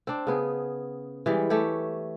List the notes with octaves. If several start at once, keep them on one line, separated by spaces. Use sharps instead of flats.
C4 D4
C#3 B3 G#4
E3 G3 G#3
A3 G4 C#5